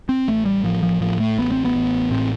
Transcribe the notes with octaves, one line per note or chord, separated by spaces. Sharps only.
C4
A1 A3
G3
A2 F3
F3
A2 F3
A3
A1 B3
C4
B3
A1
A2 C4